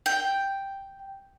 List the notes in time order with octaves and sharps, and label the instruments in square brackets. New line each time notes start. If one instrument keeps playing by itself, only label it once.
[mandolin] G5